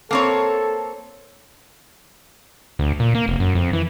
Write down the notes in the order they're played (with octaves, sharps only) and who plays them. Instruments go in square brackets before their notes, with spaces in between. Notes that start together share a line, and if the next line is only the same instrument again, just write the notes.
[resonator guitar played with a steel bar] A#3 C4 C#5 [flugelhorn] A4
[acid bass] D2
A#2
A#3
F1
F#2
F2
E3